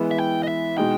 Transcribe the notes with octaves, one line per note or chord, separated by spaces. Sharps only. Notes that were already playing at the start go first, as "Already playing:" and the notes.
Already playing: E3 G#3 B3 E4
E5
G5
D#5
E5
B2 G#3 D#4 G5